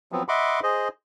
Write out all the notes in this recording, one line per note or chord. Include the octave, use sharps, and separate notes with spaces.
F3 F#3 B3 C4
D#5 E5 F#5 B5 C6 D6
G#4 C5 D#5